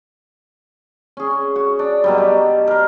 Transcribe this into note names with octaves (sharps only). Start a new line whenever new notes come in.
C#4 G#4
F#4
D4
B2 F#3 G3
G4
A#4 C5